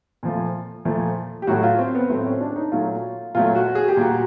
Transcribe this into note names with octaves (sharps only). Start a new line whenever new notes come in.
A#2 F3 A3
A#2 F3 A3
G4
A2 F#3 A3 F#4
F4
C4
B3
A2 F#3 A3 C4
C#4
D4
D#4
A#2 F#3 A3 F4
A#2 F#3 A3 F4
F#4
G#4
G4
A#2 G3 A#3 F#4